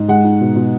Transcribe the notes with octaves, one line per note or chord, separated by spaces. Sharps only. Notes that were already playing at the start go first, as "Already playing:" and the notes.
Already playing: G#2
G#3 F#5
D#4
B2
B2